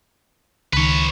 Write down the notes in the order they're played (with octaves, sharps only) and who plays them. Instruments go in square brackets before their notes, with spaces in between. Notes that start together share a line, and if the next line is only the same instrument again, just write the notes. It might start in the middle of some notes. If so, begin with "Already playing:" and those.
[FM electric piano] C#2 D#3 [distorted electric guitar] B4 C#5